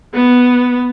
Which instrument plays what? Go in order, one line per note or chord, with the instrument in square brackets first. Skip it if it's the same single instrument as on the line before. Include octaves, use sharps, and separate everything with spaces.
[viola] B3